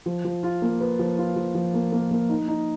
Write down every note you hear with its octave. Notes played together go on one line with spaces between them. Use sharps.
F3
F3
F4
A#3
B4
F3
F4
F3
F3
A#3
A#3
A#3
D#4
D#4